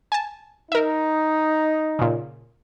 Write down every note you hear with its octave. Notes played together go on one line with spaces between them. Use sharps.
G#5 A5
D#4 A#4 E5
A#2 C#3